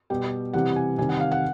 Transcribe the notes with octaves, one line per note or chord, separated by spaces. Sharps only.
B2 G3 G5
C3 E3 G3 F#5
G#5
C3 D#3 G3 G#5
F#5
F5
F#5